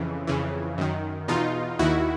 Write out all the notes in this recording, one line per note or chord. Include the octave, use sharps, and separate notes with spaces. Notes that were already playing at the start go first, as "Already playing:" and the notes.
Already playing: F2 C#3 E3
F2 C#3 E3
F#2 D#3
E2 B2 D#4 F4
D#2 D#3 E4 F#4